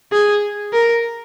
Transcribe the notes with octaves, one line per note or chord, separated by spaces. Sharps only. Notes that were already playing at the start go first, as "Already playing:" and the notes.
G#4
A#4